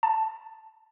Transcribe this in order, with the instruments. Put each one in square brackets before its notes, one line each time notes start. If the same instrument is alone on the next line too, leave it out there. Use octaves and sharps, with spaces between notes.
[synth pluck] A5